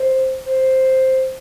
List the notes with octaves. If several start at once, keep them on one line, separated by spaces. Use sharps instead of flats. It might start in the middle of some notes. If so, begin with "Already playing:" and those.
Already playing: C5
C5